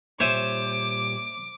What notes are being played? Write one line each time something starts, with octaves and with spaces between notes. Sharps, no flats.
A#2 G3 C5 C#5 E5 G#5 D6